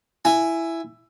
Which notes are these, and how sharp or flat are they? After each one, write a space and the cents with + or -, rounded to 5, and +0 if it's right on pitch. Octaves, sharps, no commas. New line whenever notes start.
E4 +10 G#5 +0